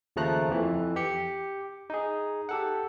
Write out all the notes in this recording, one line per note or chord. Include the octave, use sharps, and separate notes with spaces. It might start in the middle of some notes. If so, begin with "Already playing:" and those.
D#2 C#3 F3 A3 A#5 F#6
F2 E3
G4 C#7
D#4 G#4
G4 A4 F#5